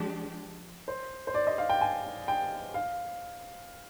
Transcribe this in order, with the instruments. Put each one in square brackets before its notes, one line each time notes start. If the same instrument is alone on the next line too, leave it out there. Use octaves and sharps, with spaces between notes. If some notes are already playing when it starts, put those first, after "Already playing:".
Already playing: [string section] F3 G#3 D4 G4
[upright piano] C5
C5
D5
D#5
F5
G5
G#5
G5
F5